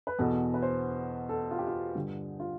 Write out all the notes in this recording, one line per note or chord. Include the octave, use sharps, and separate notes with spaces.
B4
E2 B2 A4
B4
C5
A4
F4
G4
F4
G2 D3
F4